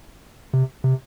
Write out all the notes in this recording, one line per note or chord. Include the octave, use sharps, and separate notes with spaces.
C3
C3